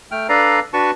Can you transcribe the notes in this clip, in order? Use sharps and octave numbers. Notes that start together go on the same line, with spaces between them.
A3 G5 F6
D4 A4 B4 D5 F5 A#5
D4 F#4 B4 A5 C#6